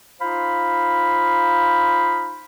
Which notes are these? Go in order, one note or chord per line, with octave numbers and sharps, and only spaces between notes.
D#4 F4 C5 F5 B5